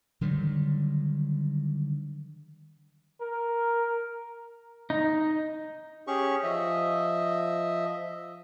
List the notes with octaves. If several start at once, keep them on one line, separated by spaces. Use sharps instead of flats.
D3 D#3 F#3 G3
A#4
D#4
C#4 G4 G#4 C#6
F3 D#5 E5